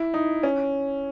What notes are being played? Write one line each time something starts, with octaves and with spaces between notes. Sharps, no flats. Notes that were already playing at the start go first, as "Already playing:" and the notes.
Already playing: E4
D#4
C#4